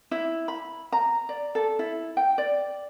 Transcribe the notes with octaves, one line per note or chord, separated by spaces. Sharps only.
E4
B5
A#5
D5
A4
E4
G5
D5